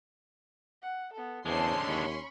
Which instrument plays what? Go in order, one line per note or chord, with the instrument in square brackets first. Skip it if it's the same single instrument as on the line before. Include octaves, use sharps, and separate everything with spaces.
[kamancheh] F#5
B3 A4
[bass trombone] E2 [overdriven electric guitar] D3 G#3 [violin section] C#4 C6 [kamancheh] C5 A5
[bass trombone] D#2 [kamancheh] B5 C#6